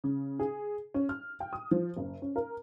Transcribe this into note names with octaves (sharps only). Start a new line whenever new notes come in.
C#3
G#4
C#4
F6
G5
D#6
F3
F#1
C#4
A#4